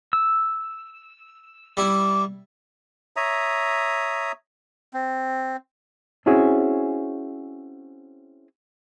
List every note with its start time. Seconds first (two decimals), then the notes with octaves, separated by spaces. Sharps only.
0.13 E6
1.77 G3 E4 D6
3.16 C#5 E5 A#5 D#6
4.94 C4
6.26 C4 C#4 E4 F#4 G#4